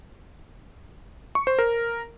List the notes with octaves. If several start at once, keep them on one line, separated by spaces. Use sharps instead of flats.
C#6
C5
A#4